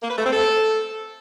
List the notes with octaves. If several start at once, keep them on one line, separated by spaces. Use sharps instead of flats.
A#3
B4
A3
C4
A4